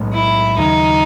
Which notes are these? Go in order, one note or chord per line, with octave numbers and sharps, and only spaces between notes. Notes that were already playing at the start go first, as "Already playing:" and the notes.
Already playing: B1 A2 G#3
E4
D#2 C#3 F#3 D#4